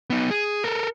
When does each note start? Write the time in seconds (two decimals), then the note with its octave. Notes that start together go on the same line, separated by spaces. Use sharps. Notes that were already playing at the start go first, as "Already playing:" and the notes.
0.10 B3 D#4
0.31 G#4
0.64 A4 A#4